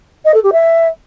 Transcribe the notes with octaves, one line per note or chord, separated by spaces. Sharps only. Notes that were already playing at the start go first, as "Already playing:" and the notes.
D#5
A4
G4
E5